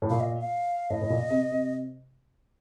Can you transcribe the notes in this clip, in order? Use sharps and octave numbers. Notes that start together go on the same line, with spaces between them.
A2
A#2 F5
D#5
F5
A2 D#5
A2
A#2
C3
C3